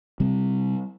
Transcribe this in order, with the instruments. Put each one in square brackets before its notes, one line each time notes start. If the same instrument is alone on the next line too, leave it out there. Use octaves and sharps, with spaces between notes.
[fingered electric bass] C3 G3 C4